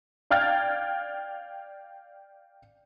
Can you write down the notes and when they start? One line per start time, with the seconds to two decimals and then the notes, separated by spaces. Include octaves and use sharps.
0.30 D5 F5 G5 F6 G#6 A6